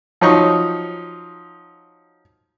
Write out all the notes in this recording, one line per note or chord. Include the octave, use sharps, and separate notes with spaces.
F3 F#3 D#4 C#6